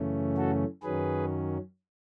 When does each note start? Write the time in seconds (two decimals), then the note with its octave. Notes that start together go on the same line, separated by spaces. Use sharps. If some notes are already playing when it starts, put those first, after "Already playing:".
Already playing: F#2 C#3 E3 A3 C#4
0.37 F#4 A4
0.83 F#2 D#3 F#3 C#4 G#4 B4